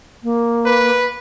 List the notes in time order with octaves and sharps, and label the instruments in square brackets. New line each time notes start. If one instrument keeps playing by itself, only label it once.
[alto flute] A#3
[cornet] B4